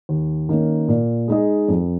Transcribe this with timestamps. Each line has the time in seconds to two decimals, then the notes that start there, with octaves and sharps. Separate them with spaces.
0.09 D#2
0.49 D#3 A#3 C#4
0.88 A#2
1.28 G#3 D#4 G#4 D#5
1.68 F2